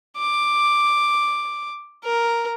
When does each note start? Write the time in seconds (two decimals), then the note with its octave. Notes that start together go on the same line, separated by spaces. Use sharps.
0.18 D6
2.04 A#4